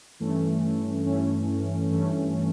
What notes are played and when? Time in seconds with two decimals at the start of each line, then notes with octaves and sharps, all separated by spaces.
0.20 G2 E3 A3 C#4
1.05 G2 E3 A3 C#4
1.91 G2 E3 A3 C#4